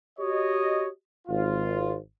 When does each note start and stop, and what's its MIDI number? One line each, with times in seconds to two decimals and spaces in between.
0.19 0.88 66
0.19 0.88 67
0.19 0.88 73
0.19 0.88 75
1.28 1.95 32
1.28 1.95 65